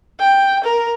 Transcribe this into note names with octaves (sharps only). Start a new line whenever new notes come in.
G5
A#4